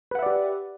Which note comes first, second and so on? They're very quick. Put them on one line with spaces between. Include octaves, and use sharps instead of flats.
B4 F#5 E5 D5 G4